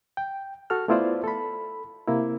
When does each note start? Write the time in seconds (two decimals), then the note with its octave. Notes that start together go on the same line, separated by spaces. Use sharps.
0.17 G5
0.70 F#4 A4 F6
0.88 A3 B3 E4 F4 C5 D5
1.24 A4 B5
2.08 C3 A#3 E4